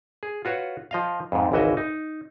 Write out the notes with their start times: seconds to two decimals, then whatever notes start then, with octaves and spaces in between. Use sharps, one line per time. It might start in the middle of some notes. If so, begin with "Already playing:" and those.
0.23 G#4
0.45 F4 F#4 B4 C#5
0.91 F3 D#5 F5
1.32 F2 G#2
1.52 G#1 C#2 E3 F#4 D#5 E5
1.77 D#4